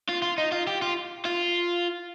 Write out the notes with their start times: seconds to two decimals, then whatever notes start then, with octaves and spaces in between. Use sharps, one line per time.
0.09 F4
0.22 F4
0.38 D#4
0.52 F4
0.67 G4
0.82 F4
1.25 F4